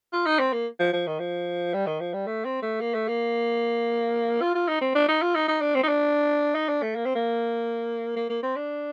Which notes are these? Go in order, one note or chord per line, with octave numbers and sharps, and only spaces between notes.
F4
D#4
C4
A#3
F3
F3
D#3
F3
G3
D#3
F3
G3
A3
C4
A3
A#3
A3
A#3
F4
F4
D#4
C4
D4
D#4
F4
D#4
D#4
D4
C4
D#4
D4
D#4
D4
A3
A#3
C4
A#3
A#3
A#3
C4
D4